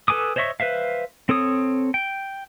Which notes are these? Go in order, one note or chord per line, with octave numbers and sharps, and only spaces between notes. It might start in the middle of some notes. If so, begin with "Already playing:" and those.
A4 B4 G#5 D6 D#6
C5 C#5 D#5 E5 C#6
B4 C5 E5 F5
C4 A4 C#5 D#6
G5